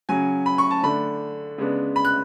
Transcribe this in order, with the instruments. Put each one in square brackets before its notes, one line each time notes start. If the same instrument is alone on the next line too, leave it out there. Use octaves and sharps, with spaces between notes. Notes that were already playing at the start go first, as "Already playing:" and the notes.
[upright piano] C#3 F#3 C#4 G#5
B5
C#6
A5
D3 A3 D4 B5
C#3 G#3 B3 D4
B5
F#6